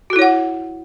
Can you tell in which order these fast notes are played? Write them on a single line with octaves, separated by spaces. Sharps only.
F#4 A4 E4 C#5 F#5